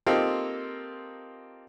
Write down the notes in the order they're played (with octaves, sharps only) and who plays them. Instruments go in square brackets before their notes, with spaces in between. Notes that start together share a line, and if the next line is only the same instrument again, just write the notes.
[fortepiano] A#3 C4 D#4 F4 G4 A4